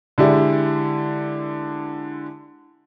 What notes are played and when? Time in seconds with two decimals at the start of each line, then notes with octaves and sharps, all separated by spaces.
0.18 D3 G#3 E4 G4 D5